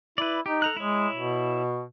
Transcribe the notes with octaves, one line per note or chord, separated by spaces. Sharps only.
E4 B4 D5
D#4 G4
A4 A#5 F#6
G#3 E4 C#5
B2